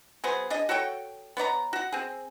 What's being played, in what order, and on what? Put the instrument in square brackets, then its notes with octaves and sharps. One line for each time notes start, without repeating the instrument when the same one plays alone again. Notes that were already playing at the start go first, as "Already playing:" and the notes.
[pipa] F#3 B3 G#4 C5
D4 G#4 D#5
F#4 A4 C#5 G5
B3 C#5 D5 A#5
F#4 F#5
C4 G#4